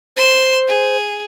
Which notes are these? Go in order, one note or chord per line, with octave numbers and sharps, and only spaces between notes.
C5 C6 E7
G#4